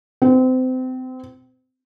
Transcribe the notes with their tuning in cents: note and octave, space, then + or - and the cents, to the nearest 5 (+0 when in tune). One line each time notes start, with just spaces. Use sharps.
C4 -30